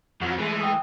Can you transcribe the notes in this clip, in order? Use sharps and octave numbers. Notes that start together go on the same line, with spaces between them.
F2 F3 F#3
E3 G#3 A3
G5 D#6